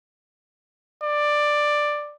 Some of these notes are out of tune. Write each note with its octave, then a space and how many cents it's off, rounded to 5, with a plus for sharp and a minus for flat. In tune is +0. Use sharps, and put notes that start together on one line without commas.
D5 +10